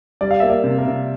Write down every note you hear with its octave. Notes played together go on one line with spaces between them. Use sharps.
G3 D5
F5
A#3 E5
D5
C3
A#4
C3